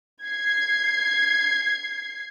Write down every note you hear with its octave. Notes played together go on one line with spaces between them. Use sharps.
G#6 C7